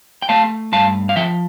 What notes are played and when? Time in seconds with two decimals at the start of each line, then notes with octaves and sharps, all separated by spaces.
0.22 G5
0.29 A3 F5 A5
0.72 G2 F5 A5
1.09 F5
1.16 F3 E5 G5